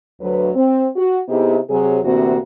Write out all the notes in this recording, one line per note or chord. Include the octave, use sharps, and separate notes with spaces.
D2 F#3 B4
C4
F#4
C3 B3 D#4 E4 G4 G#4
C3 F#3 G#4
D2 C3 E3 A#3 C4 F#4